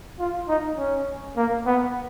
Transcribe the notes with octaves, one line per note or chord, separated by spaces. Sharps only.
F4
D#4
C#4
A#3
B3